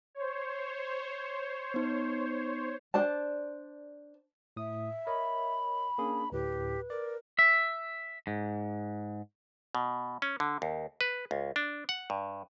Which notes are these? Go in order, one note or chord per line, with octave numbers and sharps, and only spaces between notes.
C5 C#5
B3 D#4
D4 C5 D5 A5
A2 E5 D#6
A#4 C#5 D#5 B5
A#3 C#4 D4 G#4
D2 A2 G4 B4
A#4 D5
E5
G#2
B2
C#4
D3
D#2
B4
C#2
D4
F#5
G2